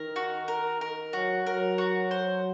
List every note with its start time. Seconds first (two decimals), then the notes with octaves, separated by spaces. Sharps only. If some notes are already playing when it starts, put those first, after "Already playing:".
Already playing: D#3 A#4
0.16 F#4
0.48 A#4
0.81 A#4
1.13 F#3 F#4
1.46 F#3 A#4
1.78 F#4
2.11 C5